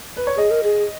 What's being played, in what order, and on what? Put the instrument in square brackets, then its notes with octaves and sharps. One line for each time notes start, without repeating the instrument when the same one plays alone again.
[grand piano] B4
C#5
[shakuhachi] G#4 [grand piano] D#5
[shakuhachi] A#4
G#4